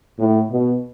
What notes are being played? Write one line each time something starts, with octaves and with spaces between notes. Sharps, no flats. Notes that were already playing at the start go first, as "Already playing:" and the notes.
A2
B2